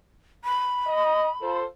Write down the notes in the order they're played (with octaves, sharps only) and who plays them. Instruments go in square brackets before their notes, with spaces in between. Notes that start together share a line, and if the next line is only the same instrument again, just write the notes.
[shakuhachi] B5
[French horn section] D#5
F4 A4 C5